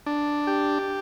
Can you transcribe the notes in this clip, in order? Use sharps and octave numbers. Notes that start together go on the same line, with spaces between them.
D4
G4